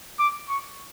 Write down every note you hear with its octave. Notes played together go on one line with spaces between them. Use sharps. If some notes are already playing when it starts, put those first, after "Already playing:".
D6
C#6